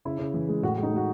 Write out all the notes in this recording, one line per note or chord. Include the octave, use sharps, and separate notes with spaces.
C#3 E4
C#3
E3
G#3
A2 F#4
G#3
D#4
G#3 F#4